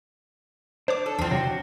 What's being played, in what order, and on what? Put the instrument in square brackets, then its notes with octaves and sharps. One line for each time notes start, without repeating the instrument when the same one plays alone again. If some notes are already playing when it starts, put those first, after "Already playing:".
[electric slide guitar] D4 [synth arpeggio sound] C5 C#5 D6
[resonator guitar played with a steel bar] A4
[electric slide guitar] E2 F3 [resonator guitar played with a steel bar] C4 D4
[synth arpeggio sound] C3 F#3 [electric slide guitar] F#4